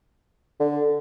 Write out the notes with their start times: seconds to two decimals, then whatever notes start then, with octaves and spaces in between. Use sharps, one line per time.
0.60 D3